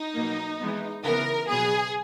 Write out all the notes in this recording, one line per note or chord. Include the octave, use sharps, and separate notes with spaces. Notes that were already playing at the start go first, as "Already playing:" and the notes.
Already playing: D#4
B2 F#3 A#3
E3 G#3 B3
C#3 E3 B3 A#4
B2 F#3 B3 G#4